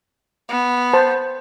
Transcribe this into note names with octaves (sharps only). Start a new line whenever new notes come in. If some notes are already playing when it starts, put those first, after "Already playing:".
B3
C5 A5